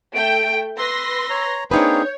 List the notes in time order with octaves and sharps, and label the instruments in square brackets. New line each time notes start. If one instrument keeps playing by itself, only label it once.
[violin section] A3 G5 [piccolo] D7
[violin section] B4 C6 A#6 [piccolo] E6
[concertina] C#5 A#5
[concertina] A#3 C4 G#4 [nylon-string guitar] D4 D#4 B4 [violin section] C#5 [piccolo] G6